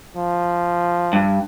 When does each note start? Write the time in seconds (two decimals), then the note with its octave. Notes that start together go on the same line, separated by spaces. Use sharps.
0.17 F3
1.13 G2